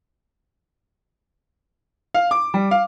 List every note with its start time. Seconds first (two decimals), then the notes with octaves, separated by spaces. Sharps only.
2.14 F5
2.31 D6
2.54 G3
2.71 F5